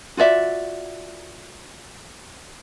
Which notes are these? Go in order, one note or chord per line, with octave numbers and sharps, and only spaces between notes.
F4 F#4 D5 E5